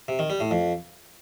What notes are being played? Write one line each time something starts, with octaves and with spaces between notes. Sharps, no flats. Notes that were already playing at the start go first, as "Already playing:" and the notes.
C3
D#3
G3
A2
F2